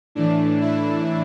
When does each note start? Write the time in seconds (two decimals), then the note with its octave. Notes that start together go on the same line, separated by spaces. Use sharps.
0.15 A2 E3 D4
0.61 E4